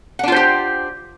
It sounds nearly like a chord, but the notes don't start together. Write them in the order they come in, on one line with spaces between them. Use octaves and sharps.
F#5 D4 F4 C5 G4